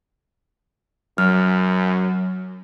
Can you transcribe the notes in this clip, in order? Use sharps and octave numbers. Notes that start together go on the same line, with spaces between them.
F#2 F#3 F6